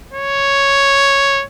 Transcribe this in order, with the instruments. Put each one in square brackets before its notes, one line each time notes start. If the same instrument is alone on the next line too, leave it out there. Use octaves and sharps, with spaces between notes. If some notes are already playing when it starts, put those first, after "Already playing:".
[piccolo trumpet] C#5